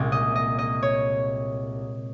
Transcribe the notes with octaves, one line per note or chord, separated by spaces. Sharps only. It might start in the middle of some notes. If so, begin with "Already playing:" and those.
Already playing: C2 A#2 G#3
D#5
D#5
D#5
C#5